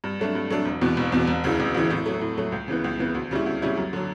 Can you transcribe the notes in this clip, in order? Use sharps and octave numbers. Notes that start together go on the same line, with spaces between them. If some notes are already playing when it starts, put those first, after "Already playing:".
G2
F#3 A3 D4
G2
F#3 A3 D4
E1
E2 B2
E1
E2 B2
E1
D2 C#3 E3
E1
D2 C#3 E3
A2
F#3 A3
A2
F#3 A3
C#2
C#3 E3 B3
C#2
C#3 E3 B3
D2
C#3 G3 C#4 E4
D2
C#3 G3 C#4 E4
F#2
D3 F#3